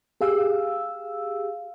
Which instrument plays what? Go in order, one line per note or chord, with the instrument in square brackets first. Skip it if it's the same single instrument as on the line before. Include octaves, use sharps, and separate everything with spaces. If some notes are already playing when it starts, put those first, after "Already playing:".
[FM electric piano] G4 G#4 F5 E6